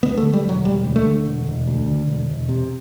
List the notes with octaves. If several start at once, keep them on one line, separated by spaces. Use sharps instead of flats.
D2 B3
A3
D3
G3
E1 F#3
E1 G3
D2
A3
D3
E1
E1
D2
D3
E1
E1
C3